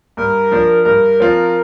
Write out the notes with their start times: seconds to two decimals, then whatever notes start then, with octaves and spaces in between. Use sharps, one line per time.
0.17 G2 A#4
0.52 F3 D4
0.85 G2 A#4
1.20 F3 C4 F4